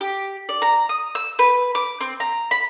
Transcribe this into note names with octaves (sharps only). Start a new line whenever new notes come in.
G4
D5
A#5
D#6
E6
B4
D6
C4
A#5
B5